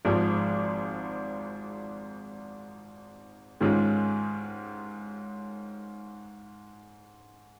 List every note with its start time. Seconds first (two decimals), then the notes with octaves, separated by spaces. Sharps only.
0.05 G#1 G#2 F3
3.61 G#2 D#3 G#3 C#4 F4